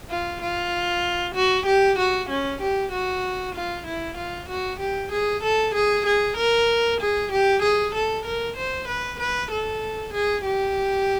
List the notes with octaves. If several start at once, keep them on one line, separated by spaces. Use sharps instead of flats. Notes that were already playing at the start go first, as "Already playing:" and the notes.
F4
F4
F#4
G4
F#4
C#4
G4
F#4
F4
E4
F4
F#4
G4
G#4
A4
G#4
G#4
A#4
G#4
G4
G#4
A4
A#4
C5
B4
B4
A4
G#4
G4